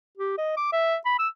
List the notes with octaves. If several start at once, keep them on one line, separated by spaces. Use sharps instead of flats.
G4
D#5
D6
E5
B5
E6